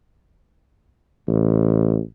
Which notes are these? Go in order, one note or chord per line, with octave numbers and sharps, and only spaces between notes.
A1